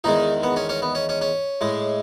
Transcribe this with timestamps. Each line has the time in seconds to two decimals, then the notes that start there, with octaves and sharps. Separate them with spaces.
0.04 E2 D#3 G#3 D#4
0.43 B3
0.56 C#4
0.69 C#4
0.82 B3
0.95 C#4
1.09 C#4
1.21 C#4
1.61 A2 G#3